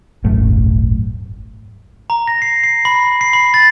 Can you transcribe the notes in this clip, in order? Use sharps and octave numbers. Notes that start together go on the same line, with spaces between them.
D#1 G#1 F#2 A3
A#5
A#6
C7
C7
B5
C7
B5
A6